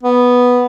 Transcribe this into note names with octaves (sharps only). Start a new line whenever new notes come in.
B3